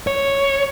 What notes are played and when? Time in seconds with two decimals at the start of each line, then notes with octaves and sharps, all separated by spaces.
0.07 C#5